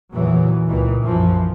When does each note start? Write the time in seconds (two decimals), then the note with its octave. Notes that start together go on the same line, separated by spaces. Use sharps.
0.13 E2 A#2 C#3 E3 F#3
0.66 C#2 A#2 D#3 E3
1.01 B1 F#2 E3 F3